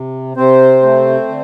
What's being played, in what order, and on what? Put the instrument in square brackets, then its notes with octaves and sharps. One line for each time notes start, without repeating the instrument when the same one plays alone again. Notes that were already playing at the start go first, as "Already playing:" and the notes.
Already playing: [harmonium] C3
C3 C4 C5
A3
D3